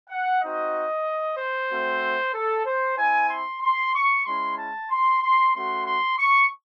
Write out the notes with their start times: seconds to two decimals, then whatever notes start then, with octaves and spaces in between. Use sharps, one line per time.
0.09 F#5
0.42 C4 D#4 F#4 D#5
1.38 C5
1.71 A3 C4 F#4
2.34 A4
2.66 C5
2.97 C4 E4 G#5
3.30 C6
3.62 C6
3.94 C#6
4.26 G#3 C#4 E4 C6
4.57 A5
4.90 C6
5.22 C6
5.54 A3 C#4 F#4 C6
5.86 C6
6.18 C#6